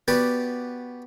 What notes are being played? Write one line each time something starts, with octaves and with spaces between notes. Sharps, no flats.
B3 F#4 G4 B4 D5